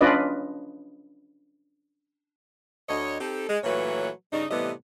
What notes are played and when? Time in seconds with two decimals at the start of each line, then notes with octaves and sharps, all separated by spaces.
0.01 C#4 D4 F4 B4 D5 D#5
2.89 D2 C#5 D#5
3.20 C4 D#4 G4 A4
3.49 G#3
3.64 A#2 E3 F#3 A3 B4 C#5
4.33 G2 C#3 D4 D#4
4.51 A2 C3 E3 G3 B3 D#5